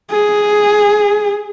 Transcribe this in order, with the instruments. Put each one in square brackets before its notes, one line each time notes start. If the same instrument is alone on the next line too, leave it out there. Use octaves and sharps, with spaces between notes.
[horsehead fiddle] G#4